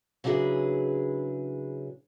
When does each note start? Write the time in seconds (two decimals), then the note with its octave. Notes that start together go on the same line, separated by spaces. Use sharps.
0.24 C#3 F#3 D4 E4 G#4 B4